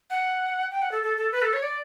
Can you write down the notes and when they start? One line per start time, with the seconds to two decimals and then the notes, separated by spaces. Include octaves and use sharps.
0.10 F#5
0.71 G5
0.82 F#5
0.92 A4
1.03 A4
1.17 A4
1.32 B4
1.42 A4
1.53 C#5
1.63 D5